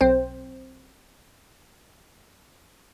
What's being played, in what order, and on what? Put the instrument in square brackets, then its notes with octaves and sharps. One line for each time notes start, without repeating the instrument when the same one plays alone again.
[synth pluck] B1 C4 C5